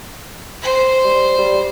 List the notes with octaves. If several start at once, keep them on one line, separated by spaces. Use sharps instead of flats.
C5
G3
G3